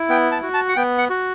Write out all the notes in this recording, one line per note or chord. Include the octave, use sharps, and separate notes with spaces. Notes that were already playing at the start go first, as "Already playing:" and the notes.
Already playing: E4
B3 G5
A5
F#4
A5
F#5
B3 G5
F#5
F#4